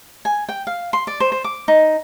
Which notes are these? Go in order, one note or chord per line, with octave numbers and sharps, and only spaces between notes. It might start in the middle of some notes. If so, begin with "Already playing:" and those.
G#5
G5
F5
C6
D5
C5
C5
D6
D#4